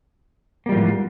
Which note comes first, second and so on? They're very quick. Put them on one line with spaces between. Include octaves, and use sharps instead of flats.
A#3 G3 F3 G#2 E3